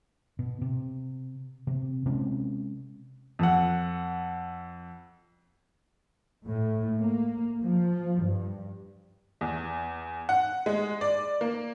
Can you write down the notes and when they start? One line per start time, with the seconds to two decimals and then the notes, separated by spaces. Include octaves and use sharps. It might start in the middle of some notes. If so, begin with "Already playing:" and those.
0.39 B2
0.61 C3
1.67 C3 C4
2.06 C3 G#3 C4 C#4
3.39 F2 F#5
6.46 A2
6.99 A#3
7.62 F3
8.22 G2
9.41 E2
10.29 F#5
10.66 G#3
11.01 D5
11.41 A#3